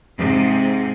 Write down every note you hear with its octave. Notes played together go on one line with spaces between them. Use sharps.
G#2 C3